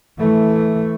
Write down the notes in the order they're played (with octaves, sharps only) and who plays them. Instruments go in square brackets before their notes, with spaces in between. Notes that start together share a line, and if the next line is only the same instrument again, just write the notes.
[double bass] E3 A3